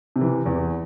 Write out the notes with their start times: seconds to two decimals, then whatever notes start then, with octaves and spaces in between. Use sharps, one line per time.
0.16 C3
0.21 E3
0.46 E2